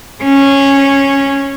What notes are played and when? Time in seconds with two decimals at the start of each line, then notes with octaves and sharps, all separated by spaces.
0.23 C#4